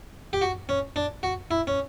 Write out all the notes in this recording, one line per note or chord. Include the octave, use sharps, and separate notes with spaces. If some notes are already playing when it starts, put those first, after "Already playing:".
G4
F#4
C#4
D4
F#4
E4
C#4